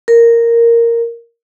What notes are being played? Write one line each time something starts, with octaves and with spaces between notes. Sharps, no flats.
A#4